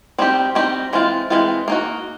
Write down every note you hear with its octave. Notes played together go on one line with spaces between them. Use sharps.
G3 C4 D#4 G4
G3 C4 D#4 G4
E3 G#3 C4 F4
E3 G#3 C4 F4
A#3 D#4 F#4